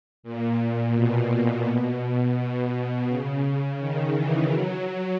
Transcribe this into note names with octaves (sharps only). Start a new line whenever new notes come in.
A#2
B2
B2
C#3
D#3
E3
F#3